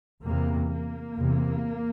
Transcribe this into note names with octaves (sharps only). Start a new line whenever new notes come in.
E2 C3 A#3
A#3
E2 C3